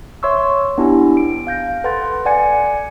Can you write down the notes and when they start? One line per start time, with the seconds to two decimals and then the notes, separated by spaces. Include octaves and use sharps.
0.23 C#5 E5 C6 C#6 E6
0.78 B3 D4 E4 G4 G#5
1.17 D7
1.47 F5 G6 A#6
1.84 A4 B4 F#5 C6 A6
2.25 D5 F#5 G#5 G#6 C#7